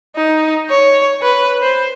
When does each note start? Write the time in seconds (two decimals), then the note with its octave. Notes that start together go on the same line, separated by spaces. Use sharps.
0.16 D#4
0.69 C#5
1.22 B4
1.62 C5